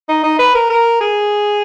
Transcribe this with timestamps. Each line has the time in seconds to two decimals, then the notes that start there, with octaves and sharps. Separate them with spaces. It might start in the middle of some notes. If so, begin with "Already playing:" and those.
0.08 D#4
0.23 D#4
0.39 B4
0.55 A#4
0.70 A#4
1.01 G#4